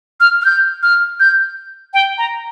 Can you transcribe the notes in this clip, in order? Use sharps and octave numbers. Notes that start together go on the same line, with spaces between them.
F6
F6
G6
F6
G6
G5
A#5